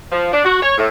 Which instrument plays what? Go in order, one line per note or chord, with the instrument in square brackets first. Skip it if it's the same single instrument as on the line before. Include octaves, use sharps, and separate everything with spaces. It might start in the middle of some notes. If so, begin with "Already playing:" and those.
[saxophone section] F3
D4
F#4
C#5
A2